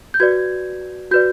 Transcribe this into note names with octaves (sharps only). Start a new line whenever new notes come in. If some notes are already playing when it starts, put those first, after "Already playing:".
G6
F#4 B4 D5 G#6
F#4 B4 D5 G6